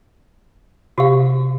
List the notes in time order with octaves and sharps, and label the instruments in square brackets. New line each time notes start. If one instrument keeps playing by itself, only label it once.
[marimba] C3 [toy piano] F#4 G4 F5